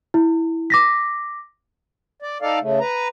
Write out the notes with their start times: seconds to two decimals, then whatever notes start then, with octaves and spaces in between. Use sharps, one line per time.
0.14 E4
0.70 D6 A#6 B6
2.22 D5
2.42 D#4 A4 D5 F5
2.61 C#3 A3
2.80 B4 A#5